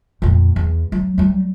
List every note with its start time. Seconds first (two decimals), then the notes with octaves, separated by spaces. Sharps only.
0.22 F2 A#2
0.56 E2
0.92 F#3
1.18 F#3 G3